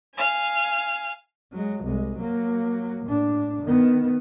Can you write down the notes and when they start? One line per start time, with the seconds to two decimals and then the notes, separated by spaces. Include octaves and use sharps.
0.16 F5 G#5
1.53 F#3 G#3
1.84 C2 G#3
2.18 F#3 A#3
3.06 A2 D4
3.62 D#3 B3